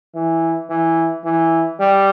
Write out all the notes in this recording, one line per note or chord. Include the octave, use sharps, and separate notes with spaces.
E3
E3
E3
G3